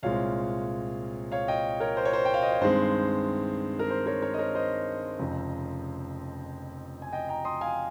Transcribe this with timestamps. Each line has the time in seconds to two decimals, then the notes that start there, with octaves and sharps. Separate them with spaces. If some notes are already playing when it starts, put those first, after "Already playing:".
0.03 C2 A#2 G#3 C4 C#5 F5
1.32 C#5 F5
1.48 D#5 G5
1.80 A#4 C#5
1.97 C5
2.05 C#5
2.13 C5
2.25 G5
2.34 F5
2.42 D#5
2.52 C#5
2.61 G2 D#3 G#3 C4 C5
3.79 A#4
3.90 C5
4.06 A#4 C#5
4.22 A#4 C#5
4.34 D#5
4.39 A#4 C#5
4.55 C5 D#5
5.19 F1 F2 C#3
7.02 G#5
7.13 D#5 G5
7.28 G5 A#5
7.45 C6 D#6
7.61 F5 G#5